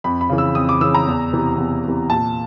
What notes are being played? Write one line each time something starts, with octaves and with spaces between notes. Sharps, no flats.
F2 B5
B5
C#3 E3
E6
F2 D#6
D6
C#3 E3 E6
A#5
E2
C3 E3
E2
C3 E3
A#2 A5